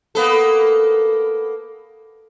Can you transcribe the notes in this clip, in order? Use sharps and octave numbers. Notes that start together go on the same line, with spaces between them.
A#3 B3 A4